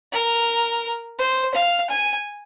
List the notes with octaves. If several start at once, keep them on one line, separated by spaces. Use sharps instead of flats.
A#4
C5
F5
G#5